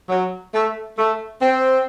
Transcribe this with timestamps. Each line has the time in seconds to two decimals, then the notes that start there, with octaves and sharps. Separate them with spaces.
0.09 F#3
0.53 A3
0.98 A3
1.41 C4